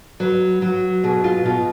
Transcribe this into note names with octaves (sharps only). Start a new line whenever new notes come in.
F#3 B4
F#3
B2 G#4
F4
B2 F4